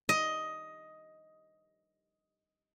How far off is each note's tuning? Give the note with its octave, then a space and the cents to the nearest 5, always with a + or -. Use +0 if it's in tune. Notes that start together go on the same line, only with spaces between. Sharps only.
D#5 +10